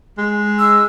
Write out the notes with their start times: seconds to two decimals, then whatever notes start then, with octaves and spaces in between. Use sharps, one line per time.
0.18 G#3
0.59 E6